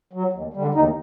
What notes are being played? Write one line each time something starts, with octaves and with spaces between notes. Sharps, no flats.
F#3
D#2
D3 G3
D#2 D#4